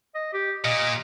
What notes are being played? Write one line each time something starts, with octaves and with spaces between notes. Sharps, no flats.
D#5
G4
A#2 D#5